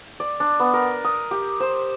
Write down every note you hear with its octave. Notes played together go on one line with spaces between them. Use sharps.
D5
D4
B3
A#4
D#6
G4
C5